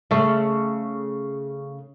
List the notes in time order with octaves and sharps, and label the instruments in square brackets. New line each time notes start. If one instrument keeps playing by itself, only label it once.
[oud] C#3 A3